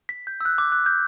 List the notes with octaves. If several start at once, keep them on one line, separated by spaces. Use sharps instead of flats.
B6
G6
E6
F#6
D6
F#6
G6